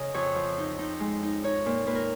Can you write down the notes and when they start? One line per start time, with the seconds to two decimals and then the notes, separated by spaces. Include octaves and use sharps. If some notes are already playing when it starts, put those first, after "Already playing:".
Already playing: C#3 D#5
0.14 F2 C#5
0.35 F3
0.58 D#4
0.79 D#4
1.00 G#3
1.23 D#4
1.44 D#4 C#5
1.66 A#2
1.87 A#2 B4
1.95 A#4